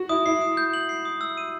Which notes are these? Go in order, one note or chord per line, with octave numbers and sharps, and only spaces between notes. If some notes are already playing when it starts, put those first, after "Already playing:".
Already playing: F#4
E4 D#6
E4 C7
D#6
G6
F#7
C7
D#6
E6
D#7